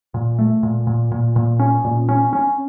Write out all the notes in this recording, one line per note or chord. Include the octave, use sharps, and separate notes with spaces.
A#2
A3
A#2
A#2
A#2
A#2
C#4
A#2
C#4
C#4